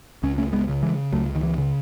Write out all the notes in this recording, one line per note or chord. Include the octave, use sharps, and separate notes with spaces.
C#2 C#4
A3 C#4
G#3 B3
C#3
E3 G#3
C#2 F#3 A3
D#3
E3
C#3